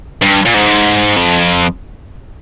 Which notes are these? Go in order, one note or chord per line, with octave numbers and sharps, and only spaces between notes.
G2
A#2
G#2
F2